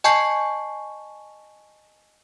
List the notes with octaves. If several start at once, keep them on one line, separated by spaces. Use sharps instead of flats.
D#5 G#5 A5 C#6 G6 C7